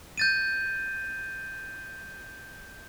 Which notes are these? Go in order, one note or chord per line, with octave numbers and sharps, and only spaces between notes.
G6 A6 D#7